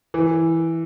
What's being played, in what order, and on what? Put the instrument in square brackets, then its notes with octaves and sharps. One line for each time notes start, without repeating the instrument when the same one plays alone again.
[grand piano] E3